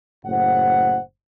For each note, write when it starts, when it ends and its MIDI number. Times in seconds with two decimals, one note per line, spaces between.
0.24 0.98 30
0.24 0.98 45
0.24 0.98 72
0.24 0.98 78